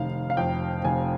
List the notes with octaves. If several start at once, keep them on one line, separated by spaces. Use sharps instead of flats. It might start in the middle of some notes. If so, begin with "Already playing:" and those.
Already playing: F1 D#3 F5
F5
F2 G5
F1 G#5